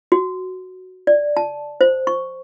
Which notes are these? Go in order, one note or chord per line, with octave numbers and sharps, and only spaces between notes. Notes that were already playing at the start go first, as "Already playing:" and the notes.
F#4
D5
A5
C5
C#6